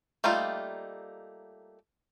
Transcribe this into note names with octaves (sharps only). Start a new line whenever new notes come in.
G3 A3 A#3 D#4 F4